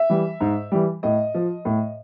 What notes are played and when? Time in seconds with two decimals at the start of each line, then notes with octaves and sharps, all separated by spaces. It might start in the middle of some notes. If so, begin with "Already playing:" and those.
Already playing: E5
0.10 E3 G3
0.40 G#2
0.72 E3 G3
1.03 A2 D#5
1.35 F3
1.65 A2